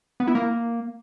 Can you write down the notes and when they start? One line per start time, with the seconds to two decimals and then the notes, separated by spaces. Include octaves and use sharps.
0.20 B3
0.27 E4
0.35 A#3